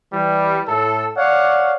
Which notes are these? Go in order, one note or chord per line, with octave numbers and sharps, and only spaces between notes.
E3 G3
A2 A4
C#5 D5 F5 F#5